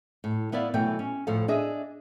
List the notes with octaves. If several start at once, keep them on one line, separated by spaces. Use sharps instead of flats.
A2
B3 E4 B4 D5 F5
B2 E3 F#3 A3 B4 G5
C#4
D2 A2 F3 A4 F5
D4 G#4 D#5 E5